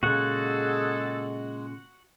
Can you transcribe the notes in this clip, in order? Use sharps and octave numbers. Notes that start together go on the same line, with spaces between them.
A#2 C#3 G#3 F#4 G#4 A4 F#5